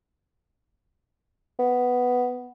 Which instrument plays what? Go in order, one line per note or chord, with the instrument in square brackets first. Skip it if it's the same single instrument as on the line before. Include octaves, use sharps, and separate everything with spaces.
[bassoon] B3